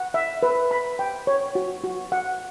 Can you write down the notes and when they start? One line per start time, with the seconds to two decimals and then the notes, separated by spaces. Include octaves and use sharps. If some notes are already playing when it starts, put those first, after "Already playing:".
Already playing: F#5
0.14 E5
0.43 B4
0.71 B5
0.99 G5
1.27 C#5
1.55 F#4
1.84 F#4
2.12 F#5